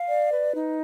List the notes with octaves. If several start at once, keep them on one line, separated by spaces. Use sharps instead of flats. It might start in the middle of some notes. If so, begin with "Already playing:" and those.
Already playing: F5
D5
B4
D#4